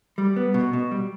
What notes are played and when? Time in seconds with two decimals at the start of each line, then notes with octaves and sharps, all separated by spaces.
0.18 G3
0.36 B3
0.54 B2
0.73 B2
0.91 G3